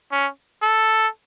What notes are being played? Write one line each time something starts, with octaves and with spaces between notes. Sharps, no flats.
C#4
A4